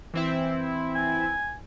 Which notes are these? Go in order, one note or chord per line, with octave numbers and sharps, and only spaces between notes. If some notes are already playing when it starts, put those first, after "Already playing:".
E3 C4 E4
G#5